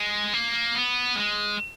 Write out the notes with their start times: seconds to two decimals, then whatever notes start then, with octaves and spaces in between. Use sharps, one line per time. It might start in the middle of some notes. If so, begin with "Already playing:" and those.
Already playing: G#3
0.33 A#3
0.75 B3
1.16 G#3